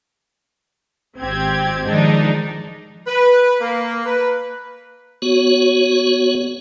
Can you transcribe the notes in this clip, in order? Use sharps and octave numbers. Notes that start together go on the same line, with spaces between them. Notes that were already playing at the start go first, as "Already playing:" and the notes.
G#1 C4 G4 G#6
D#3 F3 G#3 D4 D#4
B4
A#3
B4
B3 F#4 C#5